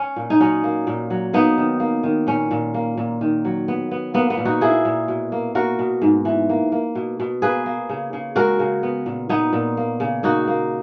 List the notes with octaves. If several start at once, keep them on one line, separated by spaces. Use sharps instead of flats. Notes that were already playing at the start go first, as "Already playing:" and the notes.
Already playing: C#4
A#2
D#4
F#3 C#4
A#3
A#2
F#3
A#3 B3 D#4
D#3
A#3
D#3
A#2 C#4
A#2
A#3
A#2
D#3
F#3
B3
B3
A#3 B3
B3
A#2
D#4 F#4
A#3 E4 G#4
A#2
B2
A#3
A#3 F#4 A#4
B2
G#2
E3
A#3
A#3
B2
B2
A#3 G#4 B4
A#3
C#3
C#3
G#3 F#4 A#4
C#3
B3
A#2
A#2 B3 D#4
A#2
A#3
C#3
A#3 D#4 F#4
A#3